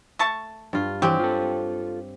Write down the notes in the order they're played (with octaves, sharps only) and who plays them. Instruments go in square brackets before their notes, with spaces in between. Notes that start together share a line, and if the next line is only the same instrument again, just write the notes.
[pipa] A3 A5 C#6
[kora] G2 F4
[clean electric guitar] E3 [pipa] F#3 G#3 [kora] C4 G4
[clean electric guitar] F4 A4